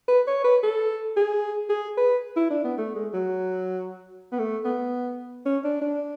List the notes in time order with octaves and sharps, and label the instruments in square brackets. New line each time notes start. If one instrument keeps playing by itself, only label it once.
[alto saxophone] B4
C#5
B4
A4
G#4
G#4
B4
E4
D4
B3
A3
G#3
F#3
B3
A3
B3
C#4
D4
D4